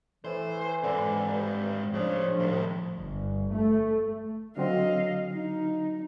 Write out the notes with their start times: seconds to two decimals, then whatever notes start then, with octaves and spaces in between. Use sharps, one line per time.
0.24 A2 E3 C5
0.84 G#2 D3 C4
1.28 G2
1.94 A2 C#3 F3 D4
2.40 C2 A2 D#3
2.96 G1
3.54 A3
4.57 D3 F#3 C4 D#5 F5
5.31 D#4